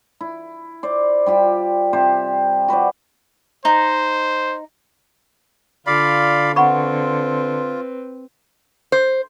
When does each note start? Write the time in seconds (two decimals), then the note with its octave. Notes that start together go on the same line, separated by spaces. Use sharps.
0.21 E4
0.83 C5 D5
1.26 G3 F4 G4
1.93 C3 G4 C5
2.68 F#4 B4 C5 D5
3.65 D#4 C5
5.87 D3 F4 D5 F5 B5
6.56 C4 F4 B4 F#5 B5 C#6
8.92 C5